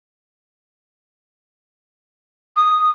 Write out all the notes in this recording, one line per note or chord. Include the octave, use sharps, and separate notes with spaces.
D#6